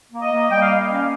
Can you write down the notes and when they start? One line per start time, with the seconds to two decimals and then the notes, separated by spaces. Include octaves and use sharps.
0.12 A#3
0.22 D#5
0.32 A#3
0.50 G3 G5
0.61 F5
0.70 A#3 D#5
0.82 F5
0.89 C#4